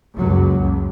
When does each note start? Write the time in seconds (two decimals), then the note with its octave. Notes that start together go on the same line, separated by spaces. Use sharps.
0.14 F#1 C#2 F#3
0.57 C#2